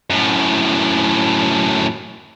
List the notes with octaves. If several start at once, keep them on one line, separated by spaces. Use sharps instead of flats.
F#2 A2